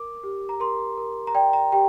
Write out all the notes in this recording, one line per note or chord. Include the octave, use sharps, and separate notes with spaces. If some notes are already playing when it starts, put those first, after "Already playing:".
Already playing: A#4 D6
G4
A#5
A#4 C6
A#4
A#5
D5 G5
A#5
G4 G5